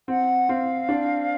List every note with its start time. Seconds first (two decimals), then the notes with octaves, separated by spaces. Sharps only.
0.08 C4 F#5
0.49 C4 F5
0.89 D4